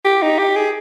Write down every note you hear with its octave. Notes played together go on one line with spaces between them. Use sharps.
G4
D#4
G4
G#4